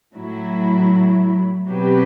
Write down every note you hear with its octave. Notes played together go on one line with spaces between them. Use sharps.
A2 F#3 A3 E4
B2 F#3 C4 G4 B4